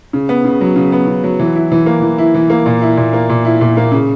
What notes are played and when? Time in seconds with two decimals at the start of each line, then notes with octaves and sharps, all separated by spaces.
0.13 C#3
0.29 B3
0.45 C#3
0.61 F#3
0.76 C#3
0.92 B3
1.07 C#3
1.23 F#3
1.39 E3
1.55 E4
1.72 E3
1.86 A#3
2.02 E3
2.18 E4
2.34 E3
2.50 A#3
2.66 A#2
2.82 E4
2.97 A#2
3.13 A#3
3.29 A#2
3.45 E4
3.61 A#2
3.77 A#3
3.92 C#3